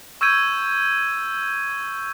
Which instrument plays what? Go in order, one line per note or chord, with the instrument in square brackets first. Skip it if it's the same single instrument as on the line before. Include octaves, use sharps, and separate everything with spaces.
[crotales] C#6 E6 G6 G#6 D#7